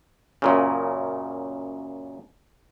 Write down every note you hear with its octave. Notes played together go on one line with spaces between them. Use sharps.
F#2 A#2 C#3